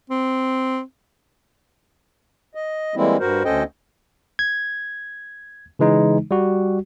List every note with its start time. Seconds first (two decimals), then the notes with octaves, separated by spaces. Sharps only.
0.10 C4
2.55 D#5
2.95 E3 G3 G#3 A#3 C4 E4
3.20 G2 F#4 A#4 C5
3.45 D2 C#4 A4 C5 D#5 G5
4.39 G#6
5.79 C#3 E3 G#3 D#4
6.31 G3 F#4